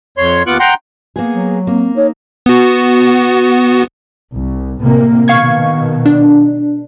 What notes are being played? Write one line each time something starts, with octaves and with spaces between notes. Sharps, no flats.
F2 C#5 C6
D#2 B3 F4 C#6 D6 F#6
F#5 G5 A#5 C6
A#3 B3 G#4
F#3
A#3 C4
D#4 C#5
B3 F#4
C2
A2 C3 A#3
B2 D#3 F5 C#6 G#6
D4